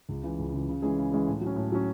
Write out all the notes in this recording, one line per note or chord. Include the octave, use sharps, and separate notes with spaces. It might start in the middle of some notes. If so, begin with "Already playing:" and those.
C#2
C#3 E3
C#2
C#3 E3
C#3
E3 G#3 C#4 G#4
C#3
E3 G#3 C#4 G#4
A2
F#3
C#4
A2
F#3 C#4